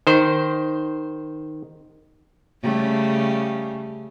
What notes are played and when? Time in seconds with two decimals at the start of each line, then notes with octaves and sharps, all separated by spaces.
0.07 D#3 C5
2.62 C#3 G3 A3